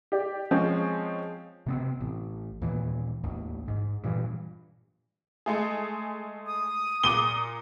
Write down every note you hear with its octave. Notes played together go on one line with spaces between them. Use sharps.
G4 D5
F3 G#3 C4 C#4
C3 B3 C4
A1
D#2 A#2 E3
A1 D#2
G#2
G2 A#2 E3
G#3 A3 G#4
D#6
A#2 D6 D#7 G7